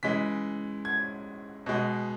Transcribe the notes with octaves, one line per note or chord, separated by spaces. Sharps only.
C#3 E3 G#3 B6
G#6
B2 G#3